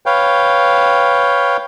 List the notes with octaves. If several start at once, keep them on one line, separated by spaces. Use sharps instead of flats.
B4 C#5 F5 G5